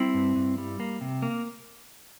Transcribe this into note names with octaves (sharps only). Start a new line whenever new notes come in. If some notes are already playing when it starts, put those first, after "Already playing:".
Already playing: G3 C4 E4
G2
G2
G3
A#3
C3
A#3